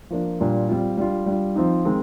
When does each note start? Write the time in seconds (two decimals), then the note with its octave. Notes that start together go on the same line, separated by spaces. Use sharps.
0.10 F3 A#3 D4 F4
0.40 A#2 G3 D4 F4
0.69 G3 C4 F4
0.97 G3 D4 F4
1.26 G3 D4 F4
1.56 F3 C4 D#4
1.85 D#3 G#3 C4